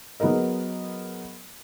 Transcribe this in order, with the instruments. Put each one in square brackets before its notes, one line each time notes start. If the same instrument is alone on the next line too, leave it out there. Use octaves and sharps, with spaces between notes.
[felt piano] F#3 B3 G#4 A#4 D#5